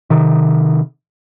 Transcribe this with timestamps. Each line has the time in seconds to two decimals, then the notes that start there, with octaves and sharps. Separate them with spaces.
0.10 C3 D#3